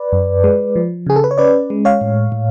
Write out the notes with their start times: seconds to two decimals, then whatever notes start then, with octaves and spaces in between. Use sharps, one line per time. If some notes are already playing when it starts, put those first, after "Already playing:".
Already playing: B4 D5
0.12 F#2
0.44 G#3
0.76 F3
1.07 C#3 G#4
1.16 A4
1.24 B4
1.31 C#5
1.38 C#4 B4 D5
1.70 G#3
1.85 C#5 F5
2.01 A2
2.32 A2